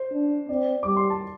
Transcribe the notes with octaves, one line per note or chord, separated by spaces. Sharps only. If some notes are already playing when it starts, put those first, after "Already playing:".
Already playing: C5
D4
C4 D5
G3 D6
C6
A5